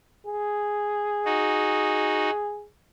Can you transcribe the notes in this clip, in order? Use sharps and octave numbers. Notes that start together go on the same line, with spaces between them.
G#4
D#4 F#4